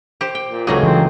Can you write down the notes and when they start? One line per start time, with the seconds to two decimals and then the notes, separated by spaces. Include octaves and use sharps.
0.21 G4 C5
0.35 G5
0.48 A#2
0.67 C#2 F#3 A3 A#3 D#4 G#4
0.83 E3 C4